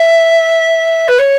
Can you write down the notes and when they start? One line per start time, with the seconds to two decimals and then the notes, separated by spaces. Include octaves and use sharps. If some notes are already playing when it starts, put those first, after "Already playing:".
Already playing: E5
1.07 B4
1.18 C#5